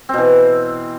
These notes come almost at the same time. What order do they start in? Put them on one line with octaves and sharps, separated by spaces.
C4 B2 E3